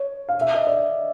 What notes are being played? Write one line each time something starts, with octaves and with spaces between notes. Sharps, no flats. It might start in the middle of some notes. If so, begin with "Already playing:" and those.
Already playing: C#5
F5
E5
D#5
D5